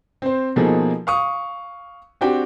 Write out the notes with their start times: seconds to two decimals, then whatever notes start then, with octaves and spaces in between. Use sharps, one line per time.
0.22 C4 C5
0.56 B2 F3 A#3 D#4 G#4 A4
1.07 F5 C#6 D#6
2.21 C4 D4 F#4 G4 G5